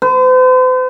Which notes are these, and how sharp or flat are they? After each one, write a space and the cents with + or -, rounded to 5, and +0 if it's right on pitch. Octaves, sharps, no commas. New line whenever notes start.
C5 -45